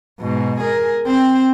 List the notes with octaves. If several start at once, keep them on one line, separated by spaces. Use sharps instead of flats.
G#2 B2
G#4 A#4
C4 G5